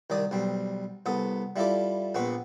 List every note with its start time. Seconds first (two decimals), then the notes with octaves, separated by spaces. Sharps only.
0.10 C2 D#3 D5 D#6
0.31 B1 G3 C4
1.06 C2 B3 A4 D#6
1.56 G3 E4 F4 A4 D5
2.15 A#1 B3 C4 B4 C#6